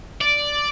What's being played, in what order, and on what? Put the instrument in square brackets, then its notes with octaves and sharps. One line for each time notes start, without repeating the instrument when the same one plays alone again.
[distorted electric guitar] D5